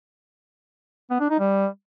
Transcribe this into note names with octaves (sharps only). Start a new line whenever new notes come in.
B3
D4
D#4
G3